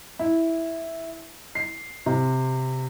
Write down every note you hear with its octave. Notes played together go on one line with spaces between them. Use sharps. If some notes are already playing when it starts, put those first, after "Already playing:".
E4
C7
C3